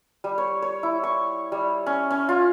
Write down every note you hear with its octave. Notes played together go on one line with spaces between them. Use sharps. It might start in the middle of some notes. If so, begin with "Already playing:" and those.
G3
C#5
C#5
E4
C#6
G3
C#4
C#4
F4